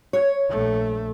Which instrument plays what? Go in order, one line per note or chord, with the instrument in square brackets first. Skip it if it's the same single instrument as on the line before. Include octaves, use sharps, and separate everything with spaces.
[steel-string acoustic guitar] C#5
[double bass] A#1 A3